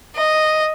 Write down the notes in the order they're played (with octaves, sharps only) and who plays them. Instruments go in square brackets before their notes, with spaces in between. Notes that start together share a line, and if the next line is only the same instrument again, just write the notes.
[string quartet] D#5